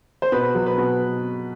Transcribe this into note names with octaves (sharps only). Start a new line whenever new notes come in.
C5
B2 B4
F#3
B4
B2